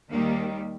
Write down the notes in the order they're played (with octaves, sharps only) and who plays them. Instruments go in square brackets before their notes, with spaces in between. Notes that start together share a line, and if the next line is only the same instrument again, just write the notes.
[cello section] D#2 D#3 G3 A#3